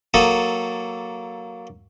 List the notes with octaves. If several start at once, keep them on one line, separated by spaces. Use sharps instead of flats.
F#3 A#3 A4 D#6